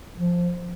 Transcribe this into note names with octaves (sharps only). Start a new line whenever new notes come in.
F3